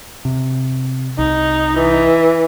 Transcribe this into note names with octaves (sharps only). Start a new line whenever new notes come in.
C3
C2 D#4
E3